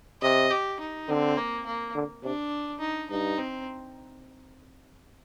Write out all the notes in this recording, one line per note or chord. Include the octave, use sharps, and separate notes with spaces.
C3 D#5
G4
D#4
D3 C4
A#3
A#3
D3
C3 D4
D#4
G2 D#4
C4